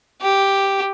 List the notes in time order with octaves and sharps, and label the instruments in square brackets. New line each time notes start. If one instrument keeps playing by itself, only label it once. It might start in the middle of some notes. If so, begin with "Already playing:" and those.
[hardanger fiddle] G4